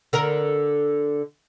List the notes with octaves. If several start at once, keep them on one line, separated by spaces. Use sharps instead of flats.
D3 A#4